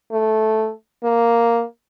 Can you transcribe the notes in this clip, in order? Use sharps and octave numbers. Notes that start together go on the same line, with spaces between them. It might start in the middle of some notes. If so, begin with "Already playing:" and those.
A3
A#3